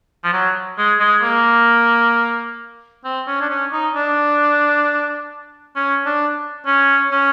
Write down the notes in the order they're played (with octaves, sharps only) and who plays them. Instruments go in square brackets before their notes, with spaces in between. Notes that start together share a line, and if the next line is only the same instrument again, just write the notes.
[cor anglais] F3
F#3
G#3
G#3
A#3
C4
C#4
D4
C#4
D#4
D4
C#4
D4
C#4
C#4